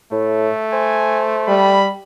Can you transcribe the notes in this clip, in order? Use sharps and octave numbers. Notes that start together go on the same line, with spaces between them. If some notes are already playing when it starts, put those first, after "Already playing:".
A2 A3
C5 G#5
G3 B5